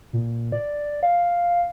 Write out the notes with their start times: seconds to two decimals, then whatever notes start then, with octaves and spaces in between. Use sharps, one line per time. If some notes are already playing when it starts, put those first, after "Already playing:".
0.13 A#2
0.52 D5
1.03 F5